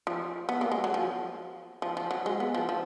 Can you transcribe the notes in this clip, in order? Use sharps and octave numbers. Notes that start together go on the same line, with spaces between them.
F3
B3
A#3
G#3
F#3
F3
F3
F3
F#3
G#3
B3
F3
F3